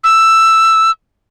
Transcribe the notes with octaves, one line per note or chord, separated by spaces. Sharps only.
E6